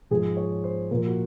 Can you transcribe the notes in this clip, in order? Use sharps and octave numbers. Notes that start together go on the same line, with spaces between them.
G#2 F3 G#4
C#5
C5
A#2 F3 A#4
F#4